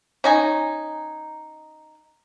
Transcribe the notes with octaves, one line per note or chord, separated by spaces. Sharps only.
C#4 D#4 G#5